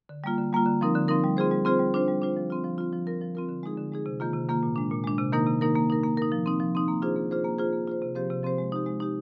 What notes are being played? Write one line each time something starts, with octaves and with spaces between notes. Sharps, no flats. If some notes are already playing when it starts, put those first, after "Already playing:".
D3
G3 A#3 F4
D3
G3 A#3 F4
D3
F3 C4 D#4 A#4
D3
F3 C4 D#4 A#4
G3
C4 F4 G#4 C5
G3
C4 F4 G#4 C5
G3
D4 F4 C5
G3
D4 F4 C5
F3
C4 F4
F3
C4 F4
F3
C4 F4 A#4
F3
C4 F4 A#4
D3
G#3 D#4 G#4
D3
G#3 D#4 G#4
C3
D#3 A#3 F4
C3
D#3 A#3 F4
A#2
G#3 D4
A#2
G#3 D4
C3
D#3 A#3 D#4 A#4
C3
D#3 A#3 D#4 A#4
A#3
D#4 A#4
A#3
D#4 A#4
F3
C4 D#4
F3
C4 D#4
A#3
D4 F4 G#4 C5
A#3
D4 F4 G#4 C5
A#3
F4 G#4 C5
A#3
F4 G#4 C5
C3
F3 C4 G4 C5
C3
F3 C4 G4 C5
G#3
D#4 G4
G#3
D#4 G4